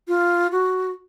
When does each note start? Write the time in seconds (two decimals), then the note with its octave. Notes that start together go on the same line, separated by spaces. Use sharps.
0.08 F4
0.52 F#4